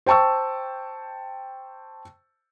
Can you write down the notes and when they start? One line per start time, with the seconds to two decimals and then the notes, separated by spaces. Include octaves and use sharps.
0.06 C5 G5 A5 C#6 E6